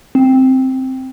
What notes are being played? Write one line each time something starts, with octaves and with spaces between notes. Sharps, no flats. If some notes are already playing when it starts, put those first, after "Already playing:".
C4